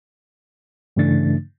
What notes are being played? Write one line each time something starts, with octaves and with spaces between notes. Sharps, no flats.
G2 C#3 E3 A3 D4 A6